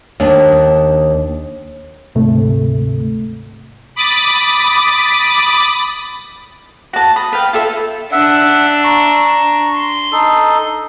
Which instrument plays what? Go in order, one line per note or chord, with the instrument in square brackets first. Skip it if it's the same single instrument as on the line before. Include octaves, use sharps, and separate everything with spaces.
[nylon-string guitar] D#2 D4
[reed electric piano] D2 G#2 C3 A3
[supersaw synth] B5 D6 D#6 A6
[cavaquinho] F#4 A5
B5 D#6
B4 F5 G5
F4 A4 E5
[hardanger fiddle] D4 [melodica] E5 F#5
[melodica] A#5 C#6
[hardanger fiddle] C6
[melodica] D#4 A4